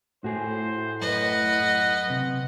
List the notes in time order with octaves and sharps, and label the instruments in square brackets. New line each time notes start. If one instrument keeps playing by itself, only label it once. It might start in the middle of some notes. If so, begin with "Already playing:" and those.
[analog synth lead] A2 [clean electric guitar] F#4 G#4 [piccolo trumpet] C5
[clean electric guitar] F#2 [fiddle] B4 D#5 [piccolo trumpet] F#5
[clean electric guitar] C3